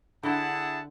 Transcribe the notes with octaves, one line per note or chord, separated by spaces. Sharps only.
D3 E4 G#4 F#5 G5 A5